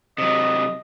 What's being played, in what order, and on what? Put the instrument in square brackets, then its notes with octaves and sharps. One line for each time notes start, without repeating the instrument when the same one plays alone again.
[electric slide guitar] C3 F#3 [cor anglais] D#5